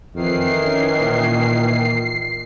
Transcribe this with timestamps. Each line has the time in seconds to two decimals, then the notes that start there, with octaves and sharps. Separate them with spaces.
0.15 F2 D#3 E3 C7
0.64 C#4
1.01 A#2